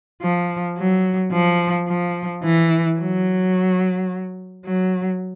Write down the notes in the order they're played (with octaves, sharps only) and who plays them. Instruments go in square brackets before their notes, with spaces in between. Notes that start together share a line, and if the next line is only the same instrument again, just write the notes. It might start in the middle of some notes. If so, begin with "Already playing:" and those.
[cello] F3
F#3
F3
F3
E3
F#3
F#3